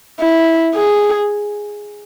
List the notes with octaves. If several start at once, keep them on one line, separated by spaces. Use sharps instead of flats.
E4
G#4